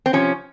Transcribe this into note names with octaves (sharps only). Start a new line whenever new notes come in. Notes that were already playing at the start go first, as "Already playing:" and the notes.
C4
C3 F3 C#4